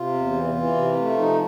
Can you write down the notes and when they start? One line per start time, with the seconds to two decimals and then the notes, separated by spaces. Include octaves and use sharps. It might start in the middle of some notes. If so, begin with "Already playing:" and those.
Already playing: C3 F4
0.14 E2
0.33 E3
0.55 E3
0.75 C3
0.97 A3
1.17 F3 D#4